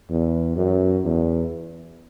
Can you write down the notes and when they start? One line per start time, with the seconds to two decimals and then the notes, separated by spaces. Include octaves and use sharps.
0.10 E2
0.56 F#2
1.04 E2